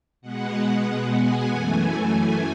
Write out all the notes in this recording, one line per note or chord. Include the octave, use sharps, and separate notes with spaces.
B2 G#3 B3 F#5
F#5
G#5
F#2 E3 A3